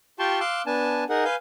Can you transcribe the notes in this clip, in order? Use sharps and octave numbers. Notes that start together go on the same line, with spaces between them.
F4 G4 G5 A5 C6 C#6
F5 C6 D6 E6 F#6
B3 D4 G#5 A5
D#4 G#4 A#4 F#5
B4 F5 G#5 G6